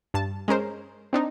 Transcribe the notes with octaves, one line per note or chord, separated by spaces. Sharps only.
G2 A5
G#3 C#4 A#4 C5
C4 D4 D#4